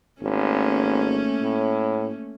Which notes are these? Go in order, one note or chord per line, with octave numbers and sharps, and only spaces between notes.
G#1 A3 A#3 C#4
A2